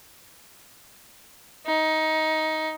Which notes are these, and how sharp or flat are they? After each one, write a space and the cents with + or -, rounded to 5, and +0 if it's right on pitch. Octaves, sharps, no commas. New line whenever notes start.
D#4 +15